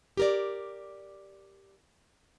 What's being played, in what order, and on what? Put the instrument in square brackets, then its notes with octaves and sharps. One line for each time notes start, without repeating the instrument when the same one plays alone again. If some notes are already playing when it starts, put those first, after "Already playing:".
[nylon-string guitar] G4 A#4 D5